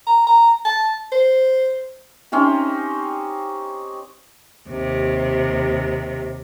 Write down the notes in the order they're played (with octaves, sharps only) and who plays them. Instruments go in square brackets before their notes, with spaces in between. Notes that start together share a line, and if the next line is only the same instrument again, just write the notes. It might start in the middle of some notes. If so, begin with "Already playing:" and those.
[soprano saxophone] A#5
A#5
A5
C5
[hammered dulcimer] C4 C#4 D#4 G4
[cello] D#2 C3